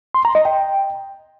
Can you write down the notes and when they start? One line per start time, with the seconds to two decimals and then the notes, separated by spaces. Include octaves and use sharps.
0.15 C6
0.25 A#5
0.35 D#5
0.45 G5